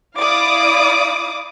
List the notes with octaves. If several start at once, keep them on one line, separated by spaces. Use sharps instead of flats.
E4 D5 F5 D6 D#6